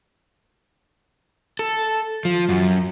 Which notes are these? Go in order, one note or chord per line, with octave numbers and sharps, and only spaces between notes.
A4
F3
F#2